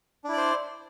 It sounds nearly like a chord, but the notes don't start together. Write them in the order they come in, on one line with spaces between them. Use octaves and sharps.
D4 E4 D5 C5